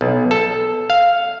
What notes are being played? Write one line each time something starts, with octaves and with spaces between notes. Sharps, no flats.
B1
A4
F5